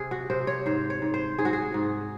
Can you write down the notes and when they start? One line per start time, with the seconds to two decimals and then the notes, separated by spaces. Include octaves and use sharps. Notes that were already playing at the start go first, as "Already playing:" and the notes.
Already playing: C3 G#4
0.11 F#4
0.30 C3 C5
0.47 C#5
0.66 G#2 C5
0.90 C#5
1.02 G#2
1.14 C5
1.39 G#2 G#4
1.45 F#4
1.53 G#4
1.74 G#2